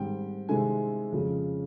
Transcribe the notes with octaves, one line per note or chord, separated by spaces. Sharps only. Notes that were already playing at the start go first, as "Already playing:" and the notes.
Already playing: G#2 D#3 G3 C4 G5
C3 D#3 G#3 C4 E4 G#5
F2 C#3 F3 G#3